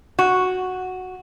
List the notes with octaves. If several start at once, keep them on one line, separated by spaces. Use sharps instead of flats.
F#4